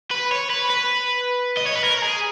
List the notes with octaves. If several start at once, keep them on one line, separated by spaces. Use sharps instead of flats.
B4
C#5
B4
B4
D#5
C#5
B4
A#4
G#4